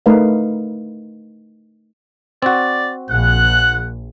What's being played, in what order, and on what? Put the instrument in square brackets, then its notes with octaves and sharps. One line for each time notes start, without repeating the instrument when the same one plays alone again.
[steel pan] A3 D#4 A#4 B4 D#5 F5
[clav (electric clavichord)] C4 F#4 [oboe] D5
[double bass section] A#1 [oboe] F#5 [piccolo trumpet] F#6